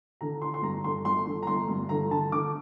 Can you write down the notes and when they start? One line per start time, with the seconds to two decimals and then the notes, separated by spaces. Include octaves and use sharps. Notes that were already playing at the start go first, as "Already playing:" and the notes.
0.21 D3 A#5
0.42 D3 C6
0.54 C6
0.62 G2 A#5
0.84 D3 C6
1.05 G1 C6
1.26 D3
1.43 A#5
1.47 G1 C6
1.68 G2
1.89 D3 A#5
2.10 D3 A5
2.31 D3 D6